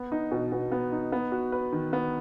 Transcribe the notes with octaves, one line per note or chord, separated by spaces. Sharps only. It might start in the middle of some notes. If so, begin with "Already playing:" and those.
Already playing: B3
D#4
B2
B2
B3
D#4
B3
F#4
B4
D#3
B3